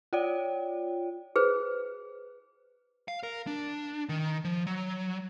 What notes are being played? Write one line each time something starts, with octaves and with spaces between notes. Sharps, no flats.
F4 C#5 D5 G5
G#4 B4 C5
F5
A#4
D4
D#3
F3
F#3